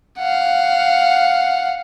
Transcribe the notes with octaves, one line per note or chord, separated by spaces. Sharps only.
F5 F#5